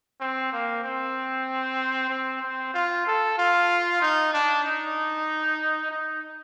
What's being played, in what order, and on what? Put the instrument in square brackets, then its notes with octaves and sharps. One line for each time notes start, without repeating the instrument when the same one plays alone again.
[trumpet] C4
A#3
C4
C4
C4
F4
A4
F4
D#4
D4
D#4
D#4